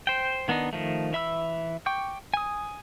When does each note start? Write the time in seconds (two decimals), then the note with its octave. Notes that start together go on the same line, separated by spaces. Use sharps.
0.07 C5 G5
0.48 D#3 B3 D4 D#4
0.73 D#3 F3 A3
1.13 E3 E5 B5 E6
1.86 G5 C#6 D6 G6
2.34 G#5 D#6